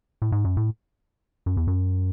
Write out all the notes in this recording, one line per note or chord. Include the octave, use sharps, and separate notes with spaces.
A2
G#2
F#2
A2
F#2
E2
F#2